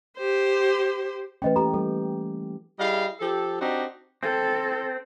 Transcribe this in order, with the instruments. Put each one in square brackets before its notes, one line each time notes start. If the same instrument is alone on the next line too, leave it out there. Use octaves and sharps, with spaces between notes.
[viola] G4 C5
[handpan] E3 A3 C#4 [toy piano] B4 D#5 G5
[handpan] A#3 G4 [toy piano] A4 A#5
[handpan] G3 [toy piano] A4
[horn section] G3 E4 G#4 D#5 F5
F3 G4 A4
C4 D4 D#4 F#4 G4
[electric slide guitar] C4 [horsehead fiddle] A4